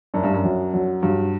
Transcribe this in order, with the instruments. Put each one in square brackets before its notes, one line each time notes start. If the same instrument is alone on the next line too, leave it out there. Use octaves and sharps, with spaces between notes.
[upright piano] F#2 [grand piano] D4
[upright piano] G2
F#2
[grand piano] F#3
F#3
[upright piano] G2 [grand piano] F#3